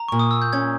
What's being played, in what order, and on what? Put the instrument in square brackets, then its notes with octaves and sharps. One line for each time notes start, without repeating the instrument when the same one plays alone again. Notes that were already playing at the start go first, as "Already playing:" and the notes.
Already playing: [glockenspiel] A#5
[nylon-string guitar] A#2 [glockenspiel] C#6
[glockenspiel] D#6
E6
G6
[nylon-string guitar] C#4 [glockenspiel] G#6